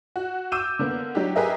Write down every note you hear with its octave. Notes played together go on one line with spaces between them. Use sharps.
F#4
D6 E6 G6 D#7 E7
D3 A#3 B3
F#3 D4 D#4 G4
G4 G#4 A#4 B4 D#5 E5